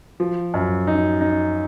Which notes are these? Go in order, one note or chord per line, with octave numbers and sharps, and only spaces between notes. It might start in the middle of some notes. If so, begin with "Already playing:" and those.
F3
F#2
D#4
D#4